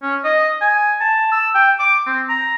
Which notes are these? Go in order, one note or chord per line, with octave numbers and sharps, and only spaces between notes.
C#4
D#5
G#5
A5
E6
G5
D6
C4
A#5